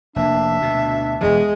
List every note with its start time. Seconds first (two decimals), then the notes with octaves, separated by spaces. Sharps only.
0.16 F1 A#3 D4 E5
0.60 D2 B2
1.21 E1 E2 E3 G#3